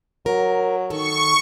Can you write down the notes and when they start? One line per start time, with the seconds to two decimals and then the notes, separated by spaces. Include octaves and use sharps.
0.26 F#3 A#4
0.90 D#3 A4 C#6